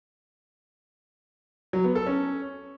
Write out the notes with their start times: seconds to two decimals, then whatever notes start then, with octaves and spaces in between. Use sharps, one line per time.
1.73 F#3
1.84 B3
1.95 A4
2.06 C#4